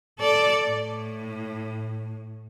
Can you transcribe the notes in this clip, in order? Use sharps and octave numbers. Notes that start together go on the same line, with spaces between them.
A4 D5
A2